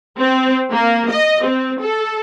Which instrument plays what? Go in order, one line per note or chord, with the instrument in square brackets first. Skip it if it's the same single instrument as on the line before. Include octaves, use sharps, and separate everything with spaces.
[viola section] C4
A#3
D#5
C4
A4